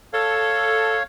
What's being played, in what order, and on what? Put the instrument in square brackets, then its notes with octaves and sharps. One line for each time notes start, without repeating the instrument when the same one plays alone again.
[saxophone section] A4 [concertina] C#5 F5